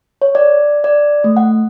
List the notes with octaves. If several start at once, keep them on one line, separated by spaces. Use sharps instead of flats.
C#5
D5
D5
A3
F#5